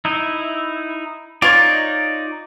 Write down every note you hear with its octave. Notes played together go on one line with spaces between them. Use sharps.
D#4 E4
D#4 F4 C#5 D5